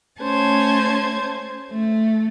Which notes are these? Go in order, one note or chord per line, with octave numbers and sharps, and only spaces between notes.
A3 C#4 C5 A5 G#6
A3